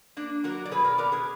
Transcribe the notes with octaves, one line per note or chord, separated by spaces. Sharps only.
A#3 D4
F#3 F#4 A#4
D5
B2 G#4 B4
A#4 D5
B3 A#4 D5
G#4 B4